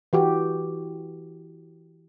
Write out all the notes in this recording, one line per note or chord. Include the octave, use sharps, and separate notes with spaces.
E3 F#4 G4